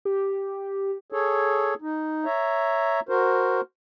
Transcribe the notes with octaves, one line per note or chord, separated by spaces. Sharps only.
G4
G#4 A4 C#5
D#4
C#5 E5 A#5
F#4 A#4 C5